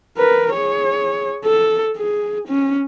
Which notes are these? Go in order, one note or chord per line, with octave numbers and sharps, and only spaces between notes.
A#4 B4
G#4 C#5
A4
G#4
C#4